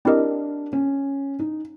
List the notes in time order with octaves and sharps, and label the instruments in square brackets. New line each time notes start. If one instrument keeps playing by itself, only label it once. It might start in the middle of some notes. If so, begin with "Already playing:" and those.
[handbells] C4 E4 G4 A#4 D#5 [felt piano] D4
[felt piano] C#4
D#4